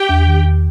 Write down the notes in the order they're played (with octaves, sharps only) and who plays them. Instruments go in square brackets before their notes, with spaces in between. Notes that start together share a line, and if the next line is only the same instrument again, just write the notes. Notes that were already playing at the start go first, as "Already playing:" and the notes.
Already playing: [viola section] G4 G5
[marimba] E2
D#3
E2